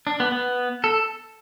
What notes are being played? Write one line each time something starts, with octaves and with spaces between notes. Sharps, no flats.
D4
B3
B3
A4